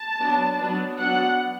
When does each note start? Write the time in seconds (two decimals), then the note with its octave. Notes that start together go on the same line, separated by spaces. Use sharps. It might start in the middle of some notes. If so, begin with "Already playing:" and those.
Already playing: A5
0.19 F#3 B3 D4
0.57 F#3 B3 D4
0.97 F#3 B3 D4 F#5